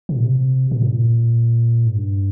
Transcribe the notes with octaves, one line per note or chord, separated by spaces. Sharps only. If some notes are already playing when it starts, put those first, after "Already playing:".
C3
A#2
C3
A#2
G#2
A#2
G#2
G2